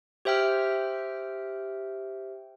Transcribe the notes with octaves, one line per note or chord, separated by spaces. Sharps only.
G4 C5 E5 G5 F6